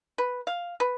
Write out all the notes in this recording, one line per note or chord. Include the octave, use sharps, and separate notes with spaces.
B4
F5
B4